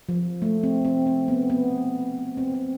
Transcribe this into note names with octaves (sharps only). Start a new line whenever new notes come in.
F3
A3
C4
C4
C4
B3
B3
C4
C4